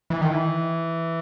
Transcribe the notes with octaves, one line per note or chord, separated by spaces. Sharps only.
E3
D#3
E3